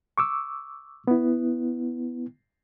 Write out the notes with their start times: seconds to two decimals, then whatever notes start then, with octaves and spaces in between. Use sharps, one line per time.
0.18 C#6 D6 E6
1.08 B3 E4